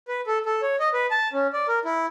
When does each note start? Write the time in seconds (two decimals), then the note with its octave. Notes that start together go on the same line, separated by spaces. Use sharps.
0.08 B4
0.27 A4
0.46 A4
0.62 C#5
0.80 D#5
0.94 B4
1.11 A5
1.33 C#4
1.53 D5
1.68 A#4
1.85 E4